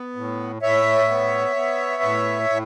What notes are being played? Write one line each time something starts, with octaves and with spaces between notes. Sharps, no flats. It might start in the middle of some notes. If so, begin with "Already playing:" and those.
Already playing: B3
A2
A2 C#5 E5
B3
B3
A2
A2